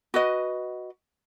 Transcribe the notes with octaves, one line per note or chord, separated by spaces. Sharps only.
F#4 B4 D#5